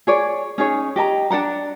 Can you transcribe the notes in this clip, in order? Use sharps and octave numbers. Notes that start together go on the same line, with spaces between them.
G#4 C#5 D5
C#4 D#4 G#4 C#5
G4 D#5 A5 A#5
D4 D5 F#5 A#5